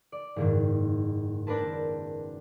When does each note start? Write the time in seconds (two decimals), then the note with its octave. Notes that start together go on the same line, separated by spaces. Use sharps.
0.12 D5
0.36 F#1 G#2 D#3
1.47 C4 D4 A#4 B4 A5